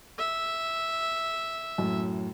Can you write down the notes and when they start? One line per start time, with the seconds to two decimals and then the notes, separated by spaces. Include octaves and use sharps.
0.19 E5
1.78 F#2 A2